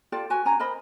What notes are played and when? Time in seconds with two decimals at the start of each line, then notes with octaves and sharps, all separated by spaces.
0.12 F4 G4 A4 D5
0.30 F#4 B4 G#5
0.45 C#4 G#5 A#5
0.59 A#4 C5 D#5 B5